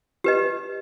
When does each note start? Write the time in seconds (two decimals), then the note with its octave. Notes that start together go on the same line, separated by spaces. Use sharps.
0.24 G4 B4 D#5